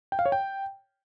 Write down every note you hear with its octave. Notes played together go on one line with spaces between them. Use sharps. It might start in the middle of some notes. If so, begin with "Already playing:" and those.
G5
F5
C#5
G5